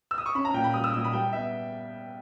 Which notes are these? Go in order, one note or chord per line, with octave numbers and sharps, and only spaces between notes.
E6
D#6
C#6
C#4 B5
A#5
A#2 G5
B5
G3 D#6
E6
A#2 D#6
B5
G3 G5
B3 E5